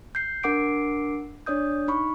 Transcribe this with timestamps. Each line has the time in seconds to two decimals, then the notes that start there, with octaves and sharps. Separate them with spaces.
0.15 G6 C7
0.43 D4 A#4 F#5 D6 C7 D7
1.46 D4 C#5 D5 D#6 G6
1.88 D#4 B5 C#6